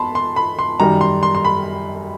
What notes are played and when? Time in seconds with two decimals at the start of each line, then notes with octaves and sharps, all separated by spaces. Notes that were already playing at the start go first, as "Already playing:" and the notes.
Already playing: E2 A5 B5 C6
0.15 C6
0.36 B5
0.59 C6
0.80 F#2 D#3 G3 A#5
1.01 C6
1.23 C6
1.35 C6
1.45 B5